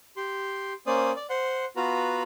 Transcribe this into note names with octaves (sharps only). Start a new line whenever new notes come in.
G4 C6
A#3 C#4 C5 D5 D#6
D5
C5 F#5 C6
B3 F4 F#4 B4 A#5